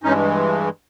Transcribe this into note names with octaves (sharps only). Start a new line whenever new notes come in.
G2 E3 G#3 C#4 D#4